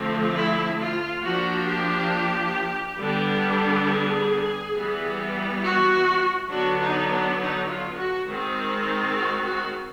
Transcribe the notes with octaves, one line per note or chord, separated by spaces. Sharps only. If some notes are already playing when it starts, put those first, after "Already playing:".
Already playing: D3 F3 A3 C4
E4
F4
F3 A#3 D4 F#4
G4
D3 G3 B3 D4
G#4
E3 G3 B3
F#4
D3 F#3 B3 D4 F#4
D#4
D4
D#4
F4
F#4
D#3 G#3 C4
F#4
F#4